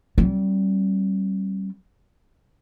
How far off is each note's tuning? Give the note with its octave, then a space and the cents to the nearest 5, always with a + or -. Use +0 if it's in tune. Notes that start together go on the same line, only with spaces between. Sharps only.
G3 -25 C4 +45